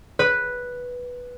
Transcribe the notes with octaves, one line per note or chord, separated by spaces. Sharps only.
B4